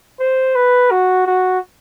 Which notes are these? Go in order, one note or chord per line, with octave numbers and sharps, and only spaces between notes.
C5
B4
F#4
F#4